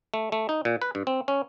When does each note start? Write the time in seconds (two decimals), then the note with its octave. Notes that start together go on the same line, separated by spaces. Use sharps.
0.14 A3
0.32 A3
0.49 D#4
0.65 A#2
0.82 B4
0.95 G2
1.07 C4
1.28 C#4